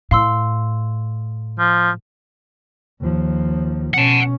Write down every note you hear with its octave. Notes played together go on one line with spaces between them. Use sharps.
A2 F5 C6 E6
F3
D#2 F3
B2 C#4 F#5 A5